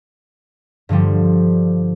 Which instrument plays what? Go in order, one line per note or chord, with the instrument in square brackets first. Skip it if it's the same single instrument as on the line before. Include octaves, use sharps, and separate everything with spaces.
[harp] G2 D3 F3 G3